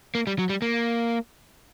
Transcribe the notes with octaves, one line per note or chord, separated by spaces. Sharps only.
A#3
G3
F#3
G3
A#3